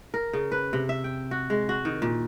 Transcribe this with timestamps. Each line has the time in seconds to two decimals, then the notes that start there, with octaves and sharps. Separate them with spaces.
0.14 A#4
0.33 C#3
0.52 B4
0.73 C3
0.89 E5
1.04 G5
1.31 F#4
1.50 G#3
1.69 F#4
1.85 D#3
2.02 A#2